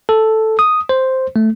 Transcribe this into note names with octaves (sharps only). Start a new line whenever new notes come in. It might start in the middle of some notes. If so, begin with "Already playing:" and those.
A4
D#6
C5
A3